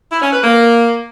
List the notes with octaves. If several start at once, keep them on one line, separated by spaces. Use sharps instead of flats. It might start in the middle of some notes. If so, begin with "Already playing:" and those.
E4
C#4
B4
A#3